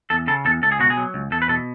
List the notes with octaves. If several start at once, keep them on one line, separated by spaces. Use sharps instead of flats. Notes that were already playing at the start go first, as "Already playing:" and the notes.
E2 A4
C#3 A4
E2 A4
C#2 A4
G#4
B2 F#4
G#4
F#3
C#2
E2 A4
B4
B2 A4